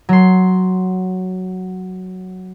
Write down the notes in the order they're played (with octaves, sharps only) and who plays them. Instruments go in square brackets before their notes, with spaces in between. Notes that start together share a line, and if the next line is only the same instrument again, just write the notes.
[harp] F#3 C6